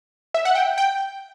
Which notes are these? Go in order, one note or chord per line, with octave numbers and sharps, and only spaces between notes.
E5
F#5
G5
G5